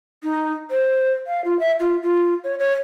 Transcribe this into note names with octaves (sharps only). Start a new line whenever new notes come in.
D#4
C5
F5
F4
E5
F4
F4
C#5
C#5